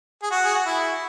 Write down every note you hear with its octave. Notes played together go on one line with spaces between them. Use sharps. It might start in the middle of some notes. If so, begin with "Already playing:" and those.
G#4
F#4
G#4
F#4
E4